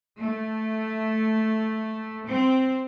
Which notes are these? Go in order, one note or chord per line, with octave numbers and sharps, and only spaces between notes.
A3
C4